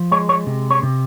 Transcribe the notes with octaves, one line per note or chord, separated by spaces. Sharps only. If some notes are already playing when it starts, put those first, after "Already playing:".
Already playing: F3
G#3 C#5
C#5
C3
C#5
C3